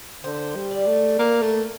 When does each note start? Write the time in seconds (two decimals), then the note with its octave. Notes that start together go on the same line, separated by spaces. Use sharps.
0.24 D3 C5
0.55 G3
0.71 D5
0.87 A3
1.19 A#3
1.42 A3